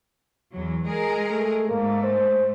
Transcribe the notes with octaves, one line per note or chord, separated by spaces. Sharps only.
E2 F#3
G#3 G#4 A#4
A3
G#2 A3 A#3
C5